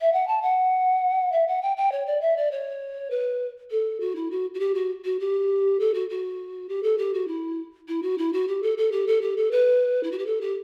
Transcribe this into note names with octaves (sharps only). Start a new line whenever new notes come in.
E5
F#5
A5
F#5
E5
F#5
G5
G5
C#5
D5
E5
D5
C#5
B4
A4
F#4
E4
F#4
F#4
G4
F#4
F#4
G4
A4
F#4
F#4
G4
A4
G4
F#4
E4
E4
F#4
E4
F#4
G4
A4
A4
G4
A4
G4
A4
B4
E4
F#4
G4
A4
G4